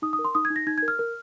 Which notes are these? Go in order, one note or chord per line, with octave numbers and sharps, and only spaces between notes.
D#4 D#6
D#6
A#4
C6
D#4 D#6
G#6
D#4
A#6
D#4 G#6
G#6
A#4
F6
A#4